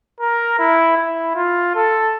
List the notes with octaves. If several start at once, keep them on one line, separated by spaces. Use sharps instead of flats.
A#4
E4
E4
F4
A4